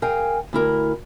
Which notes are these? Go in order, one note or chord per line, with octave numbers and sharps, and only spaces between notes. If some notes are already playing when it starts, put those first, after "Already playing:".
G#4 A#4 F5 G5 G#5
D2 E4 A#4